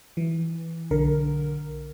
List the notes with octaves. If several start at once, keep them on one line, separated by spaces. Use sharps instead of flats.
E3
B1 D3 A#4